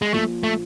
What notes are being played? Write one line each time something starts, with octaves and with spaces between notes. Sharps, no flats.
G#3
A#1 A#2 F3 A3
A3